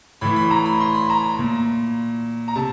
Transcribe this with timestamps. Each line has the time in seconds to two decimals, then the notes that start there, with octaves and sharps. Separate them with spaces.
0.21 A2 E3 B5
0.36 B5
0.51 A#5
0.66 B5
0.80 C6
0.95 B5
1.10 A#5
1.24 A#5
1.39 A#2
2.48 A#5
2.56 C3 A5